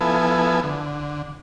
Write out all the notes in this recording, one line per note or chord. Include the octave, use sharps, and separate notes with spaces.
F3 B3 E4 A4 B4 G#5
D3